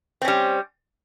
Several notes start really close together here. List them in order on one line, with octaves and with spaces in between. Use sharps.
C4 C#4 G3